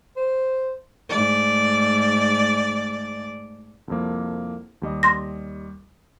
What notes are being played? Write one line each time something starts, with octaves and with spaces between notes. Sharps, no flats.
C5
G#2 A3 D5
C2 F2 A#3
D#2 G3 D#5
C6 A#6